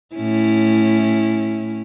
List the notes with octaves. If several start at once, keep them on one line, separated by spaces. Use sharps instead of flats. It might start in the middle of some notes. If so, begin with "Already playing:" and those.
A2 C#4 E4